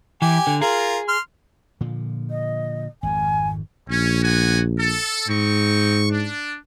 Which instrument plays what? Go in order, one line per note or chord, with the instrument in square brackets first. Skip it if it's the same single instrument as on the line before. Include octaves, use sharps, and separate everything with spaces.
[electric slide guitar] E3 [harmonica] G4 G#5
[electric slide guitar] D3
[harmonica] F4 A#4 [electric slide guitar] G#4
[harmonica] C6 F6
[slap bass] A#2 D3 F3
[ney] D#5
[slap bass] G#1 F2 [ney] G#5
[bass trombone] A#1 [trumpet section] C#4
[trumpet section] B3 F#4 G#5
A4
[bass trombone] G#2 [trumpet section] C4 D#4 C#6
[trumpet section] D4